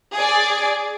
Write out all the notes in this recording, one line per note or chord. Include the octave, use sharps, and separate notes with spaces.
G#4 D5